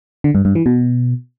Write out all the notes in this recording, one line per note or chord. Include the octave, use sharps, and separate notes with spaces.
D3
G2
G2
E3
B2